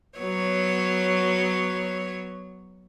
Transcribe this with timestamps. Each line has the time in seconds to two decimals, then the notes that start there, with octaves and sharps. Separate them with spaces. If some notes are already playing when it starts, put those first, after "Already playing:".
0.18 F#3 B3 C#5